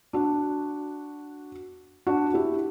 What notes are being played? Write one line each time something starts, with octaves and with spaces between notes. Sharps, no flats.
D4 F#4
D4 F#4
E4 G4